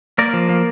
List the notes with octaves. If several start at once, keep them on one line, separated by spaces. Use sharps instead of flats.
A#3 A#4 D5
F3
A#3